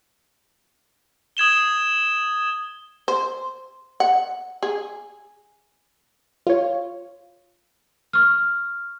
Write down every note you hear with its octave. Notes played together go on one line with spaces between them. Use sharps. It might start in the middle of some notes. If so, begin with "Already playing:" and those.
D#6 G#6 E7 G7
C5
F#5
G#4
F4 C#5
C#6 F6